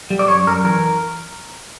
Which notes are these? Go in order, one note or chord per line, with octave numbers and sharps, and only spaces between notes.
G3
D5
F#2 C#5
F#2 A#4
E3 A#4